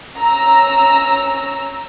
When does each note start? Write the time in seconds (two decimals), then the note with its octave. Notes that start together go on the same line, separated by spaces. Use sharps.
0.18 C#4 A#5 E6